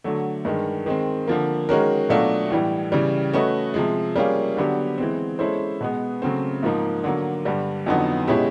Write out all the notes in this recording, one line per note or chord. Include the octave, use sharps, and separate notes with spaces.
D3 F#3 A3
G2 D#3 G#3
D#3 G#3 C4
D3 F3 A#3
D#3 G#3 C#4 F#4 A#4
B2 F#3 A3 D4 F4
A2 E3 G3
C#3 E3 G3
A3 C#4 F#4 B4 D#5
C3 F3 G#3
G3 A#3 C#4 F4 G#4
D3 F#3 B3 D4 G4
E3 G#3 C4
G#3 C#4 E4 A4 C5
B2 G#3 B3
C#3 F#3 A3 C4
G#2 F3 A#3 D#4
D3 F#3 A#3
G2 D3 G3
F2 D3 F#3 B3 D#4
B2 G#3 C#4 E4 G4